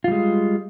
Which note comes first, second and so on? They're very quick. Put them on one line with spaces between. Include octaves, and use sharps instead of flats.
F4 G3 G#3